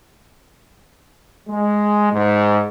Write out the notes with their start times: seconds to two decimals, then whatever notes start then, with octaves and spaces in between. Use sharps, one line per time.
1.49 G#3
2.13 G#2